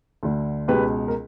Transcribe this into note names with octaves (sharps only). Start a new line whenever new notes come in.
D2 D3
C#2 B2 G4 B4
A#4